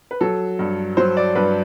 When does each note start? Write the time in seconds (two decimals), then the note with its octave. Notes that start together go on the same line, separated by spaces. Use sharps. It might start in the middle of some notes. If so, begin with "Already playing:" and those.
0.11 B4
0.21 F#3 A4
0.59 G2
0.97 F#3 C5
1.17 D5
1.35 G2 B4